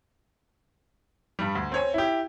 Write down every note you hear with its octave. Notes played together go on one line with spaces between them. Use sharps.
G2 G3
D2
C4 C#5 G#5
E4 G4